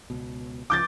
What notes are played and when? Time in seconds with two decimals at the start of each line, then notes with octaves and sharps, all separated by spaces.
0.10 C#2 B2
0.70 C#2 C#3 F3 D6 G6 A6